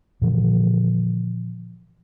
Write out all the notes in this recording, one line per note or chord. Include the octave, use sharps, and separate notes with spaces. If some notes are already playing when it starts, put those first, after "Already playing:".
A#2 D3 E3 F3